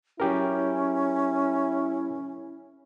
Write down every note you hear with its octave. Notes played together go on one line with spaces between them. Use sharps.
F#3 C#4 E4 G4 A#4